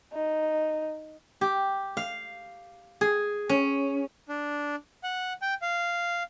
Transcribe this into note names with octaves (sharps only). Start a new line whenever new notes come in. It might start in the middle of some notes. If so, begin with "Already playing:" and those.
D#4
G4
F5
G#4
C#4
D4
F#5
G5
F5